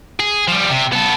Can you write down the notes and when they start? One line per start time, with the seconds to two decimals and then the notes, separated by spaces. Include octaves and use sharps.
0.20 G#4
0.48 F3 G3
0.70 C3
0.92 B3 A4